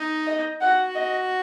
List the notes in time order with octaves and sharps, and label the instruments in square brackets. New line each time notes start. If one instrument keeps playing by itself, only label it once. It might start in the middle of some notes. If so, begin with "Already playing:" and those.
Already playing: [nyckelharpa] D#4
[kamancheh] D#5
[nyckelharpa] F#4 [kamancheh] F#5
[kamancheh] D#5